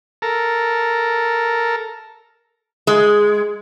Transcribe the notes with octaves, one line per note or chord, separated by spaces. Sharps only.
A4 A#4
G#3